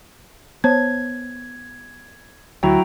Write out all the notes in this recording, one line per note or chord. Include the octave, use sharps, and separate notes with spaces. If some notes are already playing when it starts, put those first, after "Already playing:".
B3 C5 C#5 A5 G#6
D2 F#3 E4 F#4 G5 A#5